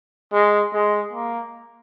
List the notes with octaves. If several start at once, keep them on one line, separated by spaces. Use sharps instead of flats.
G#3
G#3
A#3